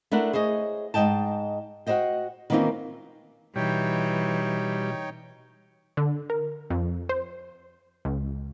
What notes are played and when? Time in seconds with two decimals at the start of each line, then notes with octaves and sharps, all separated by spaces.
0.12 A3 D4 E4 A#4 F#5
0.33 G#4 C5 C#5 D#5
0.94 G#2 E3 D#5 G5 A5
1.87 F#4 G#4 C5 D#5 G5
2.50 D#3 E3 A#3 C4 C#4 F4
3.56 B2 E3 G3 D#4 C#5 G5
5.97 D3
6.30 A#4
6.70 F2
7.09 C5
8.05 C#2